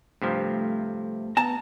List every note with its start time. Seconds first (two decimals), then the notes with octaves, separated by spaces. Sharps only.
0.22 G2 C3 F3 A3
1.37 B3 A5 A#5